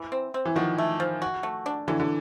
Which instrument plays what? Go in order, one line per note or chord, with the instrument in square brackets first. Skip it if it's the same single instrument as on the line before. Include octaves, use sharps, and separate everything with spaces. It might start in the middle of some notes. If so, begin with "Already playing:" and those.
Already playing: [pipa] E3
C4
C4
[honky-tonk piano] E3
[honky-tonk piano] D#3 F3 [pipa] F#4
[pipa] A3
F3
F#4
A3
D4
[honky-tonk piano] D3 E3 [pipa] F#3
[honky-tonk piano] D3